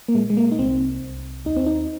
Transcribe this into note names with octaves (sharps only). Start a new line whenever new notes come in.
A#3
A#2 G#3
G#3
A#3
D#4
C2 C4
C2
D#2 D#4
C4
D#4